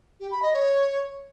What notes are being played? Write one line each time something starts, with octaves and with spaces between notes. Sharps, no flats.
G4
B5
D#5
C#5